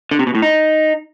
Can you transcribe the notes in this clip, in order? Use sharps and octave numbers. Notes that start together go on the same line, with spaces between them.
D3
C3
B2
A2
D#4